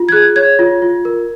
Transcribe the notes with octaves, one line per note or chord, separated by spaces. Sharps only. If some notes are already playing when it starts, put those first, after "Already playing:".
Already playing: F4
G#6
G#4 F#6
C#5 G#6
F4
F4
A#4